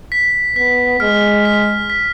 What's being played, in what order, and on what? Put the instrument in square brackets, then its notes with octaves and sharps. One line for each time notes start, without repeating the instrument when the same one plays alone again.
[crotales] B6
[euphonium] B3 [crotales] B6
[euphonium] G#3 [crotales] F6
[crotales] B6
B6